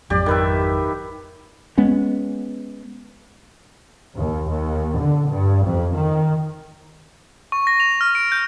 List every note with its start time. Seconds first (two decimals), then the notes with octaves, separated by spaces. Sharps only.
0.10 G#1 F2 F#3 G4 D5
0.26 D#3 B4 E5
1.78 G#3 B3 C#4
4.16 D#2
4.49 D#2
4.98 D3
5.28 G2
5.66 F2
5.97 D#3
7.52 C#6
7.67 A#6
7.80 F7
8.01 F6
8.15 D7
8.32 G6